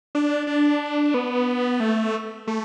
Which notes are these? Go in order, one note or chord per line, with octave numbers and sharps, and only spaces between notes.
D4
D4
B3
A3
A3